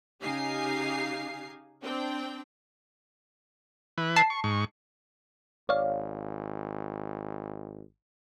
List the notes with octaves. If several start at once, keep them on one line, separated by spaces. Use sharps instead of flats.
C#3 D#4 G4 F5 G#5 C7
C4 D4 G5
E3 B4
A5 C7
C#6
G#2 C#6
G#1 C#5 D5 F5